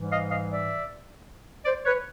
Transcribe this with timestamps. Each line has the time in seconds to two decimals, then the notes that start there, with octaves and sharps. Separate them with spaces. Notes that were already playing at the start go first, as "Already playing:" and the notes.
Already playing: G#2 E3 G3
0.11 D#5 F5
0.30 D#5 F5
0.49 D5 E5
1.65 C5 D5
1.85 B4 C#5